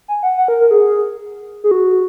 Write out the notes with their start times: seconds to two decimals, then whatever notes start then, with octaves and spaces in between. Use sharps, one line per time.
0.08 G#5
0.23 F#5
0.38 F#5
0.48 A#4
0.60 A#4
0.71 G#4
1.64 G#4
1.71 F#4